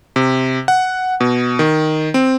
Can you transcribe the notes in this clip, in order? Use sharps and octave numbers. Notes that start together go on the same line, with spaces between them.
C3
F#5
B2
D#3
C4